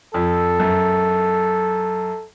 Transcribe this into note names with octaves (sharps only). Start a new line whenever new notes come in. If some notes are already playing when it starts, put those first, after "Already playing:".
F2 A4
F#2